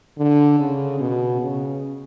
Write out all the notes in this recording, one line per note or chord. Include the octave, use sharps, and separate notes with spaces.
D3
C#3
B2
C#3